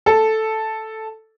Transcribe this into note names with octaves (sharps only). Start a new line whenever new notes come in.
A4